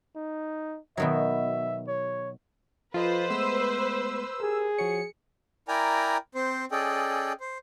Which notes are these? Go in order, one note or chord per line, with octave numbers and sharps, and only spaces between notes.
D#4
B2 D#3 F#3 E5
C#5
F3 F4 A4 B4 C5 D#5
G#3 A3 B3 E6
G4 G#4 A#4
F3 F#4 C#5 C#7
E4 A#4 D5 G5 G#5 A#5
C4 C5
C#4 G#4 A4 D5 D#5 G5
C5